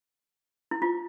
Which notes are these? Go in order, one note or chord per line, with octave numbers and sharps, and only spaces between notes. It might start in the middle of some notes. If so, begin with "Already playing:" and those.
E4
F4